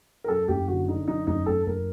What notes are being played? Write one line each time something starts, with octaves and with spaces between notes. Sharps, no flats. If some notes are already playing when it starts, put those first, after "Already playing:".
A#4
F#2 A4
F#1 G4
D3 F#4
D3 D#4
F#2 D#4
F#1 D#4
F#1 A4
F#1 A#4